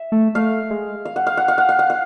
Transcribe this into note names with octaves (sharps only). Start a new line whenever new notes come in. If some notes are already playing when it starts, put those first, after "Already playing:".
Already playing: E5
A3
A3 F5
G#3
F5
F#5
F5
F#5
F5
F#5
F5
F#5
F5